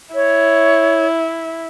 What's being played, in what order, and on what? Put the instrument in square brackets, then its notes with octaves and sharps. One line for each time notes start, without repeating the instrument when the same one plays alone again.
[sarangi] E4 [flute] C#5